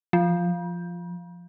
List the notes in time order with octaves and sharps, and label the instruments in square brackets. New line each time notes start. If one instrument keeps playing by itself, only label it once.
[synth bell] F3